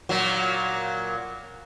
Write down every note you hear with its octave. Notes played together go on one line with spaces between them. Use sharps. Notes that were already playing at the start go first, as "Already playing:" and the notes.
A#2 F#3